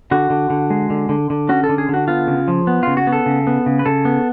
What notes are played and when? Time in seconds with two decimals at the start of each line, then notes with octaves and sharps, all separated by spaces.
0.11 D3 F#4
0.30 D3
0.50 D3
0.70 G#3
0.90 D3
1.09 D3
1.30 D3
1.49 C#4 F#4
1.64 A4
1.69 D3
1.78 G#4
1.89 D3 F#4
2.08 B3 F4
2.27 C#3
2.48 F3
2.67 B3
2.83 C#3 F4
2.97 F#4
3.07 B3
3.13 A4
3.26 C#3
3.47 B3
3.66 C#3
3.79 B4
3.86 C#3 A4
4.05 B3